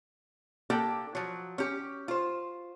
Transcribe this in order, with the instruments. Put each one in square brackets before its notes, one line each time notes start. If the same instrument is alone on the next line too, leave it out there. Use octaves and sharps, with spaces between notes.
[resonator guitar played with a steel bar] A#3 D4 G4 A4 G5
F3 F#3
C#4 G4
F4 C5